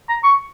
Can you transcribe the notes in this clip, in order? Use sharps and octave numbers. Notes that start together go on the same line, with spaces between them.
A#5
C#6